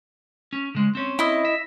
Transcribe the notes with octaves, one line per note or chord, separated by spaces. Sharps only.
C#4
C#3 G#3
C4 C#4
E4 D#5
E5